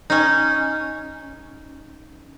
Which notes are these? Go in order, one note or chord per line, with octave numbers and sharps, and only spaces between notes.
C#4 D#4